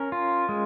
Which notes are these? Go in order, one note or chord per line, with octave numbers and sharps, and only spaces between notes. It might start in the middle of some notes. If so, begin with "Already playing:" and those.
Already playing: C#4 A#4
F4
G#3